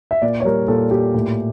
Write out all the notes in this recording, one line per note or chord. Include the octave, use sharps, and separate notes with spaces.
E5
A#2 D5
C#5
G3 A#4
A#2 A4
A#2 G4
A2